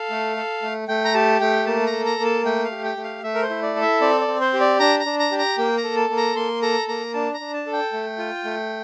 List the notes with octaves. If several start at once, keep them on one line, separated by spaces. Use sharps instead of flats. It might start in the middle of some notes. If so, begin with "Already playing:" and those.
Already playing: A4 F5
A3
A4
A3
A3 G5
A#5
G4 A5
A3 G5
A#3 A5
A#5
A4
A#5
A#3
A5
A3 G5
F5
G4
G5
A3
F5
A3 E5
A#4
C5
E4
D5
A4
E5
C4 D5
D5
C4
C5
G4
D5
D4 A#5
A#5
D4
A#5
G4
A#5
A#3 G5
A#5
A4
A5
A#3
A#5
A#3 C6
A4 A#5
A#3 A#5
D4 A5
A#5
D4
A5
A4
G5
A3
F4
A3